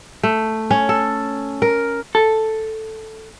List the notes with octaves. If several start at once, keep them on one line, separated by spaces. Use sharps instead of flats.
A3
C#4
A4
A#4
A4